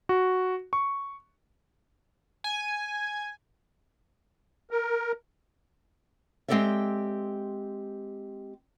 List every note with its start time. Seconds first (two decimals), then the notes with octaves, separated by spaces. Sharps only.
0.09 F#4
0.73 C#6
2.44 G#5
4.71 A#4
6.48 G#3 C4 G4 A4 D5 E5